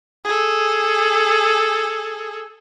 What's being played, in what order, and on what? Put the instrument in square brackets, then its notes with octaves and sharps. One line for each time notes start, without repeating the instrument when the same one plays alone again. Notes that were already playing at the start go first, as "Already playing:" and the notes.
[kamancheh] G#4 A4